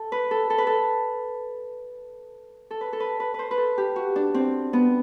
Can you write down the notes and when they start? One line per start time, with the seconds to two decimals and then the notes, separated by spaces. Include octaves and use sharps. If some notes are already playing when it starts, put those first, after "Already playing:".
Already playing: A4
0.12 B4
0.31 A4
0.50 A4
0.58 B4
0.67 A4
2.71 A4
2.81 B4
2.93 A4
3.00 B4
3.20 B4
3.34 B4 C5
3.51 B4
3.58 A4
3.78 G4
3.96 F#4
4.16 D4
4.34 C4
4.73 B3